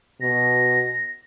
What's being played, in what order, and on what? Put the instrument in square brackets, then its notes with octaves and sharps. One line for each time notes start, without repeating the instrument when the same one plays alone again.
[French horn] B2 [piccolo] A#6